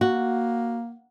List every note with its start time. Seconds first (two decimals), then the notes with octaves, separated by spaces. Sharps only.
0.01 A#3 F#4